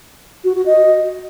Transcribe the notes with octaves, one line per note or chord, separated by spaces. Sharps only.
F#4
F#4
D#5